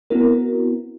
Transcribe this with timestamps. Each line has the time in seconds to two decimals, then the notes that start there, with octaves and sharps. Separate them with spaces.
0.10 B3 C4 E4 F#4 A#4